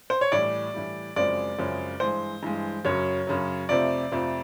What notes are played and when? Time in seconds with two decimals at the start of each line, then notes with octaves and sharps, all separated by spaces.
0.10 C5
0.21 C#5
0.32 A2 E3 G3 D5
0.74 A2 E3 G3
1.16 F#2 C#3 F3 G#3 C4 D5
1.58 F#2 C#3 F3 G#3 C4
2.00 G2 E3 G#3 C5
2.43 G2 E3 G#3
2.85 F#2 C#3 F#3 C#5
3.27 F#2 C#3 F#3
3.69 F2 C3 F3 A3 C4 D5
4.12 F2 C3 F3 A3 C4